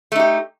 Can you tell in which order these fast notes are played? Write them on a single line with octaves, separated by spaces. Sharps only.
A3 D#4 G4